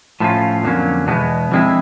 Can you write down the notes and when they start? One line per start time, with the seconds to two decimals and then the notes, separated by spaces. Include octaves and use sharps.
0.20 A2 F3 A3 C#4 F4
0.63 F2 D3 F#3 A#3 C#4
1.07 E2 B2 G#3 B3
1.51 D3 F3 G#3 C4 E4